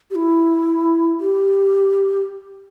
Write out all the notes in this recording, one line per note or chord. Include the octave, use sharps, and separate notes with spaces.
G4
E4
G4